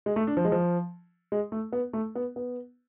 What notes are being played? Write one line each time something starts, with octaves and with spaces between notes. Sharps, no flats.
G#3
A3
D4
F3
G#3
F3
G#3
A3
B3
A3
B3
B3